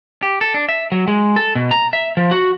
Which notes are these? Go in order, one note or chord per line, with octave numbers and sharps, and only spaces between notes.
G4
A4
D4
E5
F#3
G#3
A4
B2
A#5
E5
F3
F#4